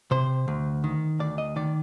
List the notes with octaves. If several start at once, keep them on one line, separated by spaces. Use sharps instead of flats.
C3 C5
D2
D#3
D2 D5
D#5
D#3 D5